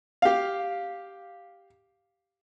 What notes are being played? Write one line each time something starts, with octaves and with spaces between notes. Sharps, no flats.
G4 F5